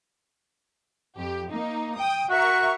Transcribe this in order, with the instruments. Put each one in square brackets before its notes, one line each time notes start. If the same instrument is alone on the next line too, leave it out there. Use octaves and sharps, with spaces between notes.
[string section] F2 G4
A#3 D#4
G5 D#6
[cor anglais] F#4 [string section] A#4 E5 C#6